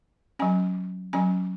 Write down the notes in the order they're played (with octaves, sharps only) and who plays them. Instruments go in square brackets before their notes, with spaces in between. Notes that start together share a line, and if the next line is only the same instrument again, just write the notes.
[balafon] F#3 C#4 G#5
F#3 C#4 G#5